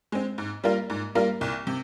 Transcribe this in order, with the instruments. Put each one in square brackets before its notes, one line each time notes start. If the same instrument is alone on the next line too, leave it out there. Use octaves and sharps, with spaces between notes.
[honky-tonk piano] G#3 C4
G#2
G3 A#3 F4 A#4
G#2
G3 A#3 F4 A#4
C2
C3